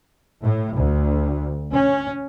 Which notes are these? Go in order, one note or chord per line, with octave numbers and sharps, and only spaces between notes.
A2
D2
C#4